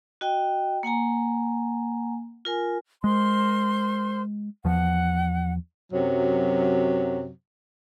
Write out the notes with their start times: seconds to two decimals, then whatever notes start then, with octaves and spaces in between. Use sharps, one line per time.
0.21 F#4 D#5 G5
0.83 A#3 F#5 G#5 A#5
2.45 F4 A#4 G#5
3.04 G#3 A#4 C5 C6
4.65 E2 F3 F#5
5.93 F#2 C3 F#3